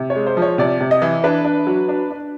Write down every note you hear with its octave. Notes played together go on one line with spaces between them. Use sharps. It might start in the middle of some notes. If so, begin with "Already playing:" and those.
Already playing: C3
C#5
G#3
C5
F3
C#5
C3 D5
C3
D#5
E3
D4 B4
D4
F#3
D4
D4